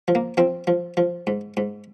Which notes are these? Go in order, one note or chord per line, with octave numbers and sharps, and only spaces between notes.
F3
A#3
F3 C4
F3
F3
G#2
G#2